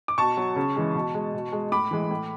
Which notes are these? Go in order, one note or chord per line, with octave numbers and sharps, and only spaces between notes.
D6
B2 A5 C#6
F#3
C#3
E3 G#3
B2
G#3
B2
G#3
A2 B5 D6
E3 G#3
A2